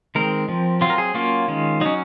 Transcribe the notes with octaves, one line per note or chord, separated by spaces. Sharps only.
D#3 G#3 C4 A#4
F3 C4
F#3 C4 F4
A#4
G#4
F#3 A#3 C#4 F4
D#3 G#3 C#4
F#3 C#4 D#4